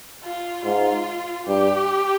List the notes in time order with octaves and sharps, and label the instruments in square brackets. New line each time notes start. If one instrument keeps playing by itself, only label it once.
[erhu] F4
[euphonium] G#2 [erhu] F4
[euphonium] G2 [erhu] G4